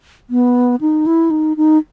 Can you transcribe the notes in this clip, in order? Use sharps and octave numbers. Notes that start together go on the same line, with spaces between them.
B3
D#4
E4
D#4
D#4